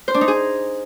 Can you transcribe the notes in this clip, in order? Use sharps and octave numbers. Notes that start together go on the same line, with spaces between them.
C5
D4
D#4
G#4